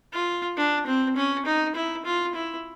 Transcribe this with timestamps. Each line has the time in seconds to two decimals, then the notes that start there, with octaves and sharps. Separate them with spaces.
0.13 F4
0.57 D4
0.87 C4
1.16 C#4
1.46 D#4
1.75 E4
2.05 F4
2.35 E4